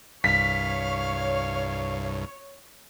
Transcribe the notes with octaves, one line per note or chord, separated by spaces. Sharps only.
C2 G2 C#5 F5 B6